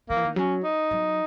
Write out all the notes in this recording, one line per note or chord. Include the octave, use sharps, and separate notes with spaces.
D#3 A#3
E3
D#3
F#3 C#4
D#4
F#3